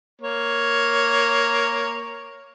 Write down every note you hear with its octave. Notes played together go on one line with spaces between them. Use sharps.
A#3 C#5